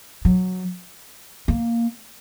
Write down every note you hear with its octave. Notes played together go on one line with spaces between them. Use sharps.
F#3
A#3